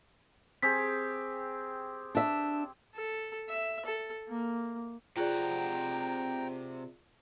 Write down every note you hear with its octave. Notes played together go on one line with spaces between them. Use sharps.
C4 G4 G#4 B6
D4 E5
A4
E5
A4
A#3
C3 F4 G#4 D5 F#5 G5 A#5